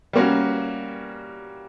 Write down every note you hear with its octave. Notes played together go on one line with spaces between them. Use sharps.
G3 A#3 C#4 F#4